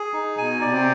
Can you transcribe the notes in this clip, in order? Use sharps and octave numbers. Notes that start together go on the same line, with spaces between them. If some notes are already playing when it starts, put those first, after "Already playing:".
Already playing: G#4
D#4
B2 G#5
B2 D5
C3